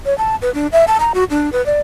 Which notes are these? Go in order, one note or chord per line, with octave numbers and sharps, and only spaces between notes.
C#5
A5
B4
D4
E5
A5
A#5
F#4
D4
B4
D5